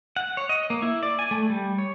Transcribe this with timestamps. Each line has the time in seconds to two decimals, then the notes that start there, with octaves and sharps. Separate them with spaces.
0.17 F#5
0.37 C#5
0.49 D#5
0.70 A#3
0.82 E4
1.03 D5
1.19 G#5
1.31 A3
1.50 G3
1.78 C#5